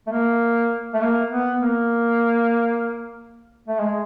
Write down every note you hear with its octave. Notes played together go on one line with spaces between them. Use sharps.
A3
A#3
A3
A#3
B3
A#3
A3
G#3